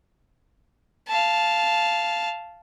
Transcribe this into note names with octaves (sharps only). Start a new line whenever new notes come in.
F5 A5